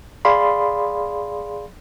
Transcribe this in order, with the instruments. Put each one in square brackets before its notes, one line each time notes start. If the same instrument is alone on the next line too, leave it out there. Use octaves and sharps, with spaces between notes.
[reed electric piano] G#4 D5 F5 B5 C6